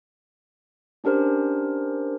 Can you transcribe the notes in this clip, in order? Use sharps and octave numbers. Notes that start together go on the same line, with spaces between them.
C#4 D4 G4 A#4 C5